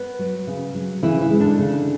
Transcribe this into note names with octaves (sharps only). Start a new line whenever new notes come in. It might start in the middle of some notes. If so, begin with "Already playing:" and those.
Already playing: B3 B4
F#3
C#3
F#3
C#3 E3 E4
E3 E4
G#3
D3 D4
C#3